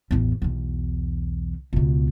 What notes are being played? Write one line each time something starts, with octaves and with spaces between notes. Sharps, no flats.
A1 E2
B1 E2
C#2 B2